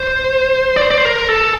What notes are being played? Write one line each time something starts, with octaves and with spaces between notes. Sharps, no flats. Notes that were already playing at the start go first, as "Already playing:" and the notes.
Already playing: C5
D5
C5
D5
C5
A#4
A4